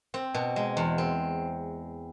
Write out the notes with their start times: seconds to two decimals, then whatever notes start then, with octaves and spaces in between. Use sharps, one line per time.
0.14 C4
0.34 B2
0.56 G#3
0.77 E2
0.98 C4